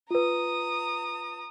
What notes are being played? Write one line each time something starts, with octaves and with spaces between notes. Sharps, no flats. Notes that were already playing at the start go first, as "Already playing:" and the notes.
F4 B4 A#5 D#6